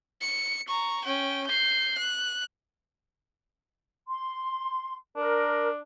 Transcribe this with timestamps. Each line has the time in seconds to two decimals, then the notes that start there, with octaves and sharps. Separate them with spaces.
0.21 C#7
0.68 A#5 C#6
1.04 C#4 G5
1.46 G6 C7
1.98 F#6
4.08 C6
5.16 D4 A#4